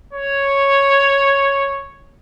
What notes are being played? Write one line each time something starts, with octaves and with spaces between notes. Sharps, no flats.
C#5